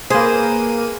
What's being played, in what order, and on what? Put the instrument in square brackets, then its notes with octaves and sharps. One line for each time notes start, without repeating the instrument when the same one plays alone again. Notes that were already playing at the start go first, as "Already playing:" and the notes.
[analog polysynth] A#3 D#7 [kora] G#4 B4 [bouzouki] C5